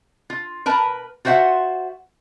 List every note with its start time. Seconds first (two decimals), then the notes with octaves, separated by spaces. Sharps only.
0.30 F4
0.66 A#4 B4 A5
1.25 F4 F#4 C5 E5 F#5